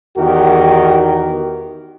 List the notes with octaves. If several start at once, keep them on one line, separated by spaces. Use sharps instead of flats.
E2 D#3 F#4 G4 A#4